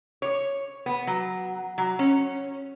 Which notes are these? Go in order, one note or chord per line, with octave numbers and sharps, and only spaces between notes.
C#5
B3
F#3
F#3
C#4